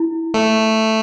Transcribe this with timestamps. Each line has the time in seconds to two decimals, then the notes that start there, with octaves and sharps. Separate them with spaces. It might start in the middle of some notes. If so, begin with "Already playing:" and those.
Already playing: E4
0.34 A3